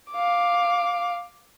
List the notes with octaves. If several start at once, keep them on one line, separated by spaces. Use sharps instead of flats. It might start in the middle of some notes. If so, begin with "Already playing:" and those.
F5 D6